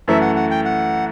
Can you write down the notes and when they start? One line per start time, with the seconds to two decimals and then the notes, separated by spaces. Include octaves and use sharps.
0.08 F#2 E3 A3 E5
0.21 F#5
0.36 F#5
0.51 G5
0.65 F#5